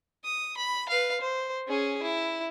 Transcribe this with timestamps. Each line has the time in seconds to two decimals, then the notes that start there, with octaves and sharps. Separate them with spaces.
0.24 D#6
0.57 B5
0.88 B4 F5
1.20 C5
1.67 C#4 G#4
2.02 E4